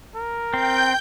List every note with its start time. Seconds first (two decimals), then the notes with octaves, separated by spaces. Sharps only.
0.15 A#4
0.54 C4 G5 G6